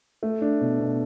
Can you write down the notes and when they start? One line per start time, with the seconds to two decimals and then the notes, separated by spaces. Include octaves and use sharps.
0.23 A3
0.41 D4
0.61 B2
0.80 B2